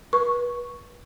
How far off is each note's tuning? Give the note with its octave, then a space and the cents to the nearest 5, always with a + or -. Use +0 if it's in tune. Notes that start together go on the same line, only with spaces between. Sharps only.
B4 -30 C#6 +0